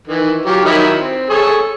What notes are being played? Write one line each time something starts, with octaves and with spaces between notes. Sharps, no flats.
D#3 E3
F#3 F4 G4
D#3 F#3 E4
C4
G#4 A4 C#5